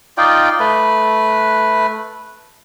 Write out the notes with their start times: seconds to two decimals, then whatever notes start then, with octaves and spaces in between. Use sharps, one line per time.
0.18 D#4 F4 D5 G5
0.60 A3 B4